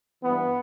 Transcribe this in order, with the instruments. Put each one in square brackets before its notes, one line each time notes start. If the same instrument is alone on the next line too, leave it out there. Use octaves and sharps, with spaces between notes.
[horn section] G2 E3 B3